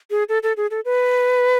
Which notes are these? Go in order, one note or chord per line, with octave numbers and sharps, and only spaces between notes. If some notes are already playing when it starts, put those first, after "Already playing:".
G#4
A4
A4
G#4
A4
B4